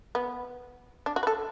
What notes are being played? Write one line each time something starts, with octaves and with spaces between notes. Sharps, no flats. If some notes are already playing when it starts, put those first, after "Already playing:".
B3
D4
F#4
B4
A4